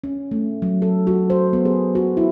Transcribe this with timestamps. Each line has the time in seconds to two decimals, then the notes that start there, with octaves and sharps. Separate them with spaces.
0.04 C#4
0.31 A3
0.62 F#3
0.82 A4
1.07 F#4
1.30 C5
1.53 B3
1.65 G#4
1.95 F#4
2.17 E4